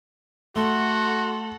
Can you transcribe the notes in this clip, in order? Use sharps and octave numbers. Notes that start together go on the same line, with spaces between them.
A3 F#4 A4 F#5 C6